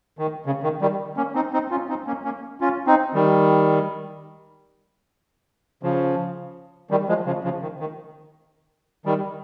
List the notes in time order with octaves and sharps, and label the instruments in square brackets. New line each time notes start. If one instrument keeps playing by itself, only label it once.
[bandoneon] D#3
C#3
D#3
D#3 G3
A#3 C#4
C4 D#4
C4 D#4
C#4 F4
C4 D#4
A#3 C#4
A#3 C#4
C#4 F4
C4 D#4
D#3 G3
C#3 F3
D#3 G3
F3 G#3
C#3 F3
C#3 F3
D#3
D#3
D#3 G3